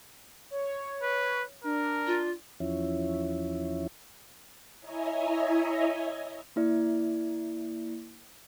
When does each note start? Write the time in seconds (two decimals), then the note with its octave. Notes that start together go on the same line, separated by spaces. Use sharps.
0.51 C#5
1.03 B4
1.64 D4 A#4
2.07 F4
2.60 E2 F3 C#4 E4
4.80 E4 C#5 D#5 E5 G#5 A#5
6.56 A#3 E4 D5